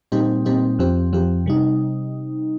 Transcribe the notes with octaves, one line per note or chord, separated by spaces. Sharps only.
A#2 G3 C4 D#4 G4
A#2 G3 C4 D#4 G4
F2 F3 C4 G4
F2 F3 C4 G4
C3 G3 D#4